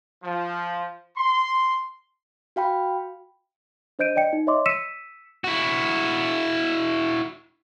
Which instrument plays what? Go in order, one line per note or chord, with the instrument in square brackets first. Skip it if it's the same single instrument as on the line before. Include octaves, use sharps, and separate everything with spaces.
[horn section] F3
C6
[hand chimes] F#4 F5 G5 B5
[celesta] D4 C5 D#5 G6 D7 D#7
D5 D#5 G5 C#7
D#4
C#5 D#5 E5 C6 D6
E6 B6 C#7 D#7 E7
[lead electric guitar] E4 F#4